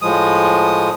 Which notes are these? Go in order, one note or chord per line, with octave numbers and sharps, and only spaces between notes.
A2 F3 G#3 D#6